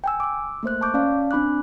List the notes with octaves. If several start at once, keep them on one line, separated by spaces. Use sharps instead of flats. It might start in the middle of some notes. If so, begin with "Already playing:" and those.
G5 G#5 E6
D6 E6
A3 A#3 C5 F#6
A5 C#6 D6 G6
C#4 D5 F5 A5
C4 D4 B5 D6 F#6